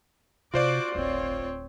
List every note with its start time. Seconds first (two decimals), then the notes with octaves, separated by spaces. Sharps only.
0.54 C3 D#4 F4 F#4 C5 D5 D6
0.95 D1 G1 C4 C#5